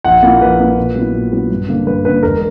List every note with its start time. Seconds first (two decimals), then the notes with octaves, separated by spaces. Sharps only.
0.04 A#1 F#5
0.23 A#2 A#3 E4
0.41 A#1 B4
0.60 A#2 A#3 E4
0.78 A#2
0.95 F#3 B3 E4
1.14 A#2
1.32 F#3 B3 E4
1.51 G2
1.68 D3 A#3
1.87 G2 B4
2.05 D3 A#3 B4
2.23 E1 A#4